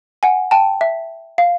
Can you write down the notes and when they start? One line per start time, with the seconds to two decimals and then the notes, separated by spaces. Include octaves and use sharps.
0.23 F#5 G#5
0.51 G5 A5
0.81 E5
1.38 F5